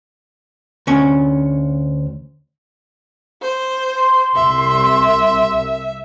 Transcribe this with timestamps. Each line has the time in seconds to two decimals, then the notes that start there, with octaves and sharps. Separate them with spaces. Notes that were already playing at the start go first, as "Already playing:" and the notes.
0.87 D2 C#4
3.42 C5
3.96 C6
4.35 C2 E5